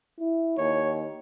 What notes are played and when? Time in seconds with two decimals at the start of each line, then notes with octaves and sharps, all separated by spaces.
0.20 E4
0.58 D#2 C#5